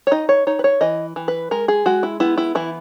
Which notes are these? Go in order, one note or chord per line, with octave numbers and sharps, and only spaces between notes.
C#5
D#4 D#5
C#5
D#4 C#5
B4
C#5
E3 D#5
E3
B4
G#3 A#4
G#4
G#3 F#4
E4
B3 E4
E4
E3 E4